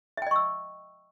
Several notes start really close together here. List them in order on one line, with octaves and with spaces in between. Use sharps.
E5 G5 D#5 C#6 E6